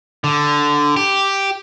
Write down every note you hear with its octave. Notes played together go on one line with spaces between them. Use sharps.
D3
G4